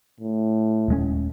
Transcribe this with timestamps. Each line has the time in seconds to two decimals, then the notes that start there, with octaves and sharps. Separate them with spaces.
0.20 A2
0.88 D#1 G#3 C#4